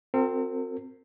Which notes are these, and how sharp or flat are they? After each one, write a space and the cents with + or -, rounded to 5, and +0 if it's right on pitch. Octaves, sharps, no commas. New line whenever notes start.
C4 +0 F#4 -35 A#4 -45